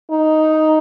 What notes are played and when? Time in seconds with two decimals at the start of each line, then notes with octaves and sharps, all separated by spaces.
0.11 D#4